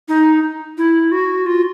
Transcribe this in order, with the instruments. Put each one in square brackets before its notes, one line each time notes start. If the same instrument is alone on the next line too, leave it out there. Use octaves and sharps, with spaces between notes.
[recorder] D#4
E4
F#4
F4